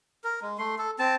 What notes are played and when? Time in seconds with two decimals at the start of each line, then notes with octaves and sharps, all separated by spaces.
0.24 A#4
0.42 G#3
0.58 A3 C6
0.78 A4
0.99 C4 A5